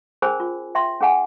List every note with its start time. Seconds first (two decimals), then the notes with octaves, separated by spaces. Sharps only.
0.22 C#4 G#4 A#4 C5 G#5 B5
0.40 F4
0.75 E5 G5 C6
1.01 C#4 G#4 F#5 G#5